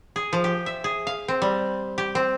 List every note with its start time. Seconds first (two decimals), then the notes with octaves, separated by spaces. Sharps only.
0.16 G#4
0.33 F3
0.44 G4
0.66 E5
0.84 G#4
1.07 F5
1.28 C4
1.42 G3
1.98 G4
2.15 C4